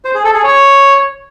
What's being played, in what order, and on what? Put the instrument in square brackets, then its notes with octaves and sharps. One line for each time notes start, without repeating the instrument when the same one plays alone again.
[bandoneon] C5
G#4
A4
G#4
C#5